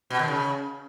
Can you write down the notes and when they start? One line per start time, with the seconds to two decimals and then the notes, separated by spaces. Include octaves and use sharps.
0.10 B2
0.19 D#3
0.28 C#3